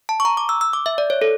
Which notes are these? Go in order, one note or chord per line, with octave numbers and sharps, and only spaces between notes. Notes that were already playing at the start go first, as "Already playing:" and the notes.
A5
C#6
A#5
D6
E6
E6
D6
E5
D5
C#5
A4